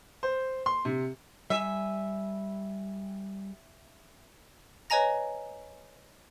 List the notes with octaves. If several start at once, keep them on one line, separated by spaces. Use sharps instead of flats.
C5
C6
C3
G3 E5 G#5
B4 C#5 D#5 G#5 A#5 A#6